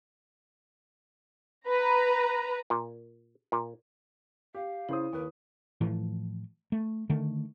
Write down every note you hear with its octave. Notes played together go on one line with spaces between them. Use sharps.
B4 A#5
A#2
A#2
G4 F5
C#3 E4 C5 D#6
D#2 A#4 B4
A2 E3 F3
A3
D3 D#3 A3